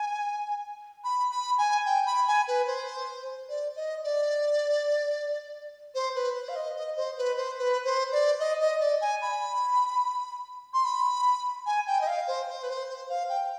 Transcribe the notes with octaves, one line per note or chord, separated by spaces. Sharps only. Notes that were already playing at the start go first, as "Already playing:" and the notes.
Already playing: G#5
B5
B5
G#5
G5
B5
G#5
B4
C5
D5
D#5
D5
C5
B4
C5
F5
D#5
D#5
C5
B4
C5
B4
C5
D5
D#5
D#5
D5
G#5
B5
C6
B5
G#5
G5
D#5
F5
C5
C5
B4
C5
C5
F5
G5